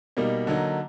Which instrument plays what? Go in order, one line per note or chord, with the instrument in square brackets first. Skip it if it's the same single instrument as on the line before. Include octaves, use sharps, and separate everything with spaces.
[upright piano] B2 G3 A#3 D#4
D3 F#3 A#3 D#4